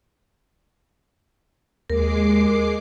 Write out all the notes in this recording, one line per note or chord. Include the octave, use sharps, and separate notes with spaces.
D#2 G#3 A#4 D6 C7